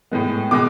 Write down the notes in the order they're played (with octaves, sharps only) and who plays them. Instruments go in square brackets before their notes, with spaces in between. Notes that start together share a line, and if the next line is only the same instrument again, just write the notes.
[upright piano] A2 G#3 B3
B2 G#3 D6